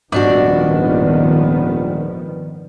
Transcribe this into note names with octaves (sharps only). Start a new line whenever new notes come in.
D#1 G#2 D#3 F3 B3 D4 F#4 D5